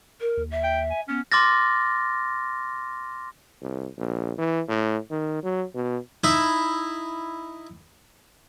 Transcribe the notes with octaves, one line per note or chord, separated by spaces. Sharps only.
A#4
D#2
E5
G5
G#5
B3 C#4
C6 D6 F6 A6 A#6
C2
A#1
E3
A2
D#3
F#3
B2
D#4 E4